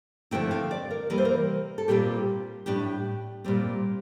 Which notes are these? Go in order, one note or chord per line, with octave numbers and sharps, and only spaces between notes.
D3 F3 A3 C4 E4 G5
F5
D5
A#4
C3 E3 G3 A#3 A#4
C5
A#4
A4
A#2 G3 C4 F4 G4
A2 G3 D4 G4
A#2 G3 C4